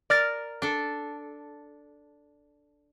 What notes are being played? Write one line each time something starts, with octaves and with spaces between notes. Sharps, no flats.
A#4 D5 F6 A6
D4 A4